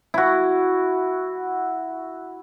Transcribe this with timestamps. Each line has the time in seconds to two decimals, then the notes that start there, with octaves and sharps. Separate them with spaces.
0.14 E4 F#4